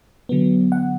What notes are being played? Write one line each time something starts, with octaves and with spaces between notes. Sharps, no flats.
D3 F#3 B3
F#5